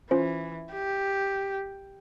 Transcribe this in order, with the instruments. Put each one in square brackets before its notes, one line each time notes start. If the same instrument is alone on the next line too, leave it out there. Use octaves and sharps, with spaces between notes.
[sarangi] E3 [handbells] C#4 F4 C5
[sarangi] G4